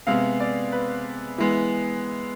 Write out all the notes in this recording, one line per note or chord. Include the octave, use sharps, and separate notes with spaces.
C3 G#3 B3 F5
D5
B4
E3 G#3 B3